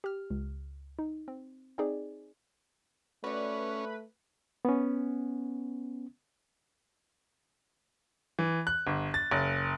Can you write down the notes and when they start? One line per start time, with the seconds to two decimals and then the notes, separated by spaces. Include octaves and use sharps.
0.04 G4 F6
0.30 C#2
0.99 D#4
1.28 C4
1.78 C4 D#4 G#4 D5
3.24 A3 C#4 F#4 B4 D5
4.65 B3 C#4
8.39 E3
8.67 F#6
8.87 G1
9.14 A6
9.31 F#1